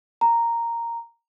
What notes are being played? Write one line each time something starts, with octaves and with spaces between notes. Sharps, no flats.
A#5